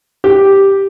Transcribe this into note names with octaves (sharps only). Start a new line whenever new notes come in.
G4